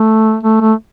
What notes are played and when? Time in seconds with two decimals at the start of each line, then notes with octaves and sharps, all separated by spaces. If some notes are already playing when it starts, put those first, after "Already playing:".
Already playing: A3
0.43 A3
0.61 A3